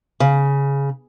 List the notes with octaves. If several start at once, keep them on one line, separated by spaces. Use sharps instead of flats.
C#3